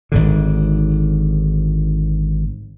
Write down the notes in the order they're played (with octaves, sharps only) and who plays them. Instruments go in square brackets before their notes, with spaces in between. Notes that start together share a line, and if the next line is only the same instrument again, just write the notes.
[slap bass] G#1 G#2 D3